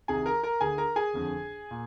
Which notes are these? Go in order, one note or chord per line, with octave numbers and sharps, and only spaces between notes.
C2 C3 D#3 G#4 G#5
A#4 A#5
A#4 A#5
D2 D3 G#4 G#5
A#4 A#5
G#4 G#5
G1 F2 D3
A#2